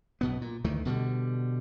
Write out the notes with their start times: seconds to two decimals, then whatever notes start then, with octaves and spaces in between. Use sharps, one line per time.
0.21 B1 B2 B3
0.41 A#2
0.64 D2 D#3 E3 A3
0.85 B2 D3 F3 G3